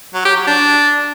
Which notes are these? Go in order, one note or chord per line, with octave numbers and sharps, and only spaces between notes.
F#3
G4
F#3
D4